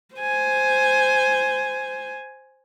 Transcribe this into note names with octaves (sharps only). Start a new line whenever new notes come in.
C5 G#5